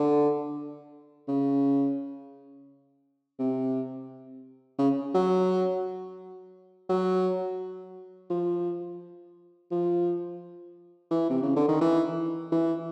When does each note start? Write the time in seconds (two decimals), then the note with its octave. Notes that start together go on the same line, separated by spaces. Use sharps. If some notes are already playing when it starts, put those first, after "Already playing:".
Already playing: D3
1.28 C#3
3.39 C3
4.78 C#3
5.15 F#3
6.89 F#3
8.30 F3
9.71 F3
11.11 E3
11.30 C3
11.42 C#3
11.56 D3
11.68 D#3
11.81 E3
12.52 E3